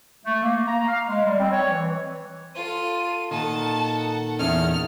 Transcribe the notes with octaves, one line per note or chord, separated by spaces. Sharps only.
A3
A#3
A#5
F5
G#3
G3
C4
C#5
E3
F4 A4 D#7
A#2 D#3 A4 F#5 A5
E2 C#4 F6